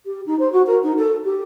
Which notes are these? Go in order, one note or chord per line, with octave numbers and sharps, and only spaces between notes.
G4
D#4
C5
F#4
A#4
D#4
A4
G4